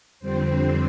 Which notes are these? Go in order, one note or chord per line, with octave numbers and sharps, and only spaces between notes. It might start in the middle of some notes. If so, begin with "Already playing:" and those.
F2 D3 G3 C4 C5